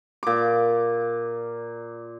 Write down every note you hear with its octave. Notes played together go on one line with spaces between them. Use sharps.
A#2 D6